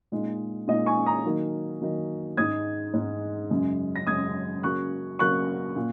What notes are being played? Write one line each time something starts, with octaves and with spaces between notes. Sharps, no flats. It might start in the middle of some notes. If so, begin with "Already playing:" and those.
A#2 G#3 D#4
A#2 G#3 D#4 D#5
G#5 C#6
A#5 D#6
D#3 F#3 A#3 D#4
D#3 F#3 A#3 D#4
G#2 G#3 D#4 D#6 G#6
G#2 G#3 D#4
F#2 C#3 G#3
A#6
F#2 C#3 G#3 D#6 G#6
C#3 F#3 A#3 C#6 F#6
C#3 F#3 A#3 C#6 F#6
A#2